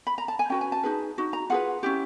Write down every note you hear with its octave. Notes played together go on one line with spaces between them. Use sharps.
B5
A#5
A5
G#5
C#4 F#4 B4 G5
G#5
A5
D#4 G#4 B4
D#4 F#4
A#5
F4 G#4 B4 F#5
C#4 E4 G4